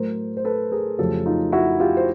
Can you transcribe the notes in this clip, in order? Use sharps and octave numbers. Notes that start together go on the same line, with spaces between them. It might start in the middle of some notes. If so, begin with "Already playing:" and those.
Already playing: A2 F#3 A3 A#4 C5
C5
A4 B4
G#4 A#4
F2 C#3 F#3 A3 G4 A4
D#4 F4
E4 F#4
F4 G4
C5